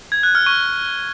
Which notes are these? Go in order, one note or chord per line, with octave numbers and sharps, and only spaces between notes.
G#6
F#6
F6
C#6